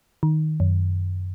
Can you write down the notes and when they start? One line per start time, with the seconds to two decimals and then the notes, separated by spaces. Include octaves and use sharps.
0.23 D#3
0.60 F#2